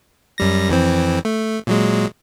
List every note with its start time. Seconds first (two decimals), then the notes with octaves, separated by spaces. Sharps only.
0.38 F#2 G3 A#6
0.69 F2 E3 C4
1.25 A3
1.67 A#2 F#3 G#3